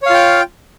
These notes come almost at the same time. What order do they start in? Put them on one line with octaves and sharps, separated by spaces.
C#5 F5 F4 G5